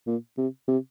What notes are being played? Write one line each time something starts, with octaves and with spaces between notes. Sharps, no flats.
A#2
C3
C3